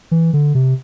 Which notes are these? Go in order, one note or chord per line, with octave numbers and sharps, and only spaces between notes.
E3
D3
C3